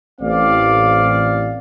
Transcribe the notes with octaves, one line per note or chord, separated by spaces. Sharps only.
A1 C4 D5 F5